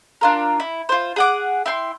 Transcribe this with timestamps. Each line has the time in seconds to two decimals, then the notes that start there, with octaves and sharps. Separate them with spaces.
0.21 D4 F4 A#4
0.60 E4
0.89 F4 C5
1.16 G#4 F#5 D6
1.66 E4 G5 C6